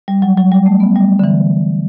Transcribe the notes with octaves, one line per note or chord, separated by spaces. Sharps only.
G3
F#3
F#3
G3
A3
B3
G3
D3
E3